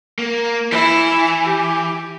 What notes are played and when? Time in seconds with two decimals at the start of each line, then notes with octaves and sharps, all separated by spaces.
0.19 A#3
0.72 E3 E4
1.45 G4